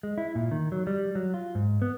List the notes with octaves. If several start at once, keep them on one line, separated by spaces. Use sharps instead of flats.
G#3
E4
A#2
D#3
F#3
G3
F#3
F4
G#2
B3